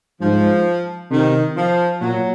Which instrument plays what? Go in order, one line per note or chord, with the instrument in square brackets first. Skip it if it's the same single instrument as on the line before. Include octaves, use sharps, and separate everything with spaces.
[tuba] G#2 [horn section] F3
[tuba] C3 [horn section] D#3
[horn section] F3
[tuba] A#2 [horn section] F#3